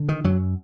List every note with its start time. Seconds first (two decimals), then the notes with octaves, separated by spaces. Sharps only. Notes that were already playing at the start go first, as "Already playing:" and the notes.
Already playing: D3
0.09 D#3
0.24 F#2 F#3